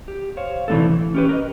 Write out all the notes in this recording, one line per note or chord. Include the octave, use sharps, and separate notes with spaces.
G4
C5 C#5 F5
C3 E3 A3 B3 D4 A4
E3
C#4 G4 B4
A#4 B4 D#5